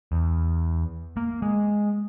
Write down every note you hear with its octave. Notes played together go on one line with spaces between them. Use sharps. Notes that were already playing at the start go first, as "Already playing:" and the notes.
E2
A#3
G#3